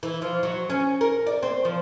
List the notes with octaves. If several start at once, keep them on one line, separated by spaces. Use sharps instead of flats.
E3
F3
F#3
C#4
A#4
D5
C4
F3